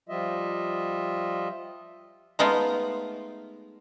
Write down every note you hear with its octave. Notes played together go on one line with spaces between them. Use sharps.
F3 G3 F4 D#5 E5
G#3 A3 B3 D#4 F4